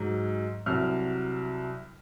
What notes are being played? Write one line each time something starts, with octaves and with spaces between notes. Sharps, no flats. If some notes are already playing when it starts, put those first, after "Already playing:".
Already playing: G#2 F#3
C2 C3 F#3 F6